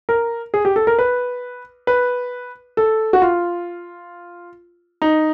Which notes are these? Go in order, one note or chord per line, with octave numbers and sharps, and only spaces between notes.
A#4
G#4
G4
A4
A#4
B4
B4
A4
F#4
F4
D#4